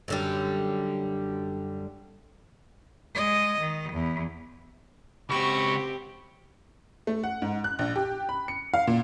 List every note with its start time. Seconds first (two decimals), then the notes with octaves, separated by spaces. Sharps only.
0.08 F#2 D3 G3
3.15 G#3 D#5
3.60 D#3
3.92 E2
5.30 C#2 C4 F#4 G4 B5 C#6
7.07 A3
7.24 F#5
7.42 G#2
7.64 F#6
7.79 A#1
7.96 G4
8.29 B5
8.48 C#7
8.74 F5
8.87 A#2